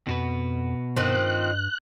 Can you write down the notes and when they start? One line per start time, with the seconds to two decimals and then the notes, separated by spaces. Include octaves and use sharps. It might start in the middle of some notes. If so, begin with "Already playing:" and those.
0.07 F2 B2 F#4 B4
0.96 G2 D#3 F3 C4 F#6